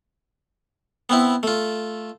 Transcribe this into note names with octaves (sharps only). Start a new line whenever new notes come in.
B3 C4 E4
A3 F4